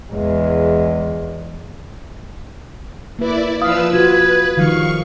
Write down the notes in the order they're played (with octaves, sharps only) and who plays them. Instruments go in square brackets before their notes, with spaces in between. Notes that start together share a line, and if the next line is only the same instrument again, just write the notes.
[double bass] E2 G#3
[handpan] A#3 B4 [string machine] E4 D5
[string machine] F3 B4 E6 [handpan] F5 [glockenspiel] D#6
[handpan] F4 F#4 [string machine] B4 [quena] G#6
[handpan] D#3 F3 G3 [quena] F5 [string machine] C#6